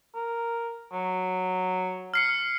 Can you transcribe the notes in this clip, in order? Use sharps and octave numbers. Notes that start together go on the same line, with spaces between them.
A#4
F#3
F6 C7 C#7